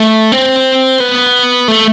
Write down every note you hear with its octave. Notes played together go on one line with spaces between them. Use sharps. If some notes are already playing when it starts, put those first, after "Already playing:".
Already playing: A3
C4
B3
A3